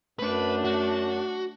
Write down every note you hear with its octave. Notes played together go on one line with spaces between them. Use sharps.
F#2 A3 D4 B4
F#4